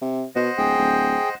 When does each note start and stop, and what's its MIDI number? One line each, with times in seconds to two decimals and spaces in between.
0.01 0.25 48
0.36 0.50 47
0.36 1.35 72
0.36 1.35 75
0.36 1.35 78
0.58 0.76 26
0.58 1.29 68
0.58 1.29 79
0.78 1.16 26